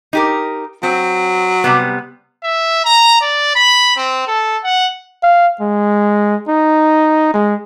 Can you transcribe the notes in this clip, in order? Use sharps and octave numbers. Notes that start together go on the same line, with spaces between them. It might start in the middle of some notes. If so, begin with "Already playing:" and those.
D#4 G4 A#4
F#3 C4
C3 G3 B3
E5
A#5
D5
B5
C4
A4
F#5
F5
G#3
D#4
G#3